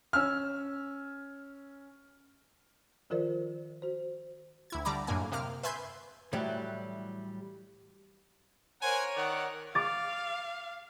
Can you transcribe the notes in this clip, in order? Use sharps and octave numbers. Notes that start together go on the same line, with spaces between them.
C#4 E6 F6
D#3 F3 F4 A#4 C5 D5
F#4 C5
D2 E4 G#6
D3 G3 D5 A#5 B5 D6
F#2 A2 D3 A#3 G#5
C3 A#3 D6 F6
B4 E5 G#5 C6 G6 G#6
A2 E3 F#3 G3
A#4 C5 C#5 F#5 G#5
D#3 D5 F#5
F5 D6 A6